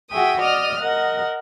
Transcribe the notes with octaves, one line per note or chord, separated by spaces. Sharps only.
F#4 G#4 E5 G5 D#6
D5 D#5 D#6 F6
A#4 D#5 F#5